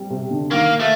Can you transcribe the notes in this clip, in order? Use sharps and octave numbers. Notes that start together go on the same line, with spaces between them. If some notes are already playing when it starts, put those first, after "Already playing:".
Already playing: G3 C4
C3
D3
D#3 A#3
A3